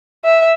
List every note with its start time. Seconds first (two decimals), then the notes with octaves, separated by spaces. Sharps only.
0.25 E5